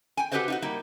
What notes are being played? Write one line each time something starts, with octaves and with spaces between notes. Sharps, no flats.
G5 G#5
F#4 G4 A4 B4 C5 D#5
D#4 F4 F#4
G3 A#3 D#4